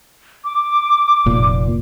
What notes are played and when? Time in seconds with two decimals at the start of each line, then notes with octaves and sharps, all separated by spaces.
0.44 D6
1.26 F1 A#2